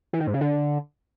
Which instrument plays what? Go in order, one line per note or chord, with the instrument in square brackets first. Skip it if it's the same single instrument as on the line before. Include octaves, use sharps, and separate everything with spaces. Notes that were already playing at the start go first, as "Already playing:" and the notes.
[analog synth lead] E3
D#3
G#2
C#3
D3